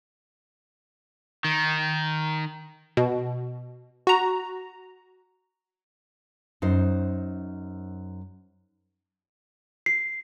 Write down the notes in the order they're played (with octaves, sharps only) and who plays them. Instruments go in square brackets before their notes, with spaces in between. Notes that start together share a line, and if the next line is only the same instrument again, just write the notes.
[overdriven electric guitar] D#3
[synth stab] B2
F#4 A#5
[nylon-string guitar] F#2 D#4 C5
[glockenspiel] C7